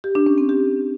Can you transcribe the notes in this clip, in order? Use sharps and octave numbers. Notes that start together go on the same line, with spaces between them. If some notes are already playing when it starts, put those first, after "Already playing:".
G4
D4
C#4
C4
G4